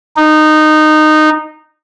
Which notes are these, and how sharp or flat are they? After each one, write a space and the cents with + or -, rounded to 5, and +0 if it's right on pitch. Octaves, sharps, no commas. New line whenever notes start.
D#4 -15